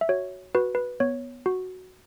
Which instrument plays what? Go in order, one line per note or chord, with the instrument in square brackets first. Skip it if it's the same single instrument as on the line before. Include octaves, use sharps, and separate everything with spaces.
[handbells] E5
F#4 C#5
F#4 B4
B4
B3 C#5
F#4